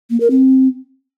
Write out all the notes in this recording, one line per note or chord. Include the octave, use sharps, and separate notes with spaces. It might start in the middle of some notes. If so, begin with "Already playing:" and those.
A#3
A#4
C4